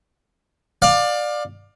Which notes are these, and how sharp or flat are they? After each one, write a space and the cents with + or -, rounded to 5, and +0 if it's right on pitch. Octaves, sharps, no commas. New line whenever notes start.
D5 +20 F5 +25